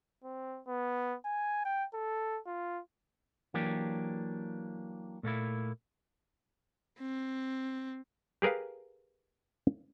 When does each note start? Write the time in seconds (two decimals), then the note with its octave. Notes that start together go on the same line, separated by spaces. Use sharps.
0.24 C4
0.67 B3
1.25 G#5
1.65 G5
1.94 A4
2.47 F4
3.54 E3 F#3 A#3 D4 G4
5.23 A#2 A3 A#3 E4
7.00 C4
8.42 G4 G#4 A#4 B4 F5